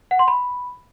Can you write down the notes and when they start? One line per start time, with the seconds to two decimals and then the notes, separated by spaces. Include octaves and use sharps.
0.11 F#5
0.19 C6
0.28 B5